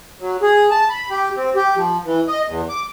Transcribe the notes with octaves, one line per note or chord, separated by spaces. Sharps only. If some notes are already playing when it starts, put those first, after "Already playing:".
F#3
G#4
A5
B5
G4
C4
G4
F3
E3
D#5
E2
D6